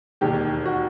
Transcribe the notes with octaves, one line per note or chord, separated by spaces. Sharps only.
E1 D#2 D#3 G4
F#4